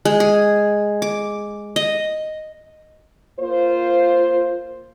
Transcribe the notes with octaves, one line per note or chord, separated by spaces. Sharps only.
G#3
G#4
D6
D#5
A#3 F4 C5